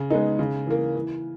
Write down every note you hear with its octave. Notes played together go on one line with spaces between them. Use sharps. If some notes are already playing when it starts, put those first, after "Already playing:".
Already playing: C#3
G#3 B3 D#4
C#3
E3 A#3
E3